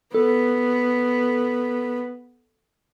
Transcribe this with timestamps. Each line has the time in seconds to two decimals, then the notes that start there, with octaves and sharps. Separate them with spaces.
0.15 B3 A4